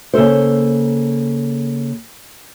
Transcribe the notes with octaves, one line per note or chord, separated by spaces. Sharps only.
C#3 A#3 A4 C5